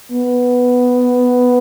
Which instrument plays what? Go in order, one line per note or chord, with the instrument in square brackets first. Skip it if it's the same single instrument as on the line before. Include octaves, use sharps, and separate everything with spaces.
[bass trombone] B3